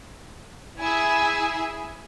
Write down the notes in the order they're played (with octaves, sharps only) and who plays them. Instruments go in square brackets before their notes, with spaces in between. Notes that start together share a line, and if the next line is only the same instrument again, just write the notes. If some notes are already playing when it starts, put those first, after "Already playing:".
[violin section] E4 G#4 E5 [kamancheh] G#5